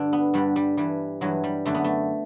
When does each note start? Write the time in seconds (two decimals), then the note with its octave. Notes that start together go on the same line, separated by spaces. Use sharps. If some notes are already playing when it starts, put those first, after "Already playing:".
Already playing: G2 D3 D4
0.13 B3
0.34 G2 D3 G3
0.56 G3
0.77 G2 E3 G3
1.21 G2 E3 F#3
1.44 G3
1.65 F#2 D3 A3
1.74 B3
1.84 A3